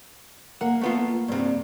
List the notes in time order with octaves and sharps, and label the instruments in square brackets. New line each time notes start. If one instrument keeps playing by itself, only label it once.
[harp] A#3 [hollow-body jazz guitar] F#5
[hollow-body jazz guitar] A3 B3 F4
G2 C3